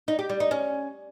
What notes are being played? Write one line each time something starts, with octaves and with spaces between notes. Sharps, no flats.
D#4
G4
G3
D#4
C#4